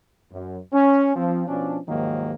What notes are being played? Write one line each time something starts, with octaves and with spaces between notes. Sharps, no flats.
F#2
C#4
F3 C4
B2 F3 C#4 D4
D#2 G#2 D#3 F3 F#3 A#3